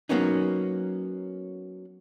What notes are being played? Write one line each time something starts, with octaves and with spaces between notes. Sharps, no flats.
F#3 A#3 B3 C#4 D#4